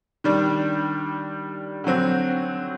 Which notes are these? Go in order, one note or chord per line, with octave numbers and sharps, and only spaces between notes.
D#3 G3 D4
D3 F#3 C4 F#4